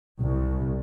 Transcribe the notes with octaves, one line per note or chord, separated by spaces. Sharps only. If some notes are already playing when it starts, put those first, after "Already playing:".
C2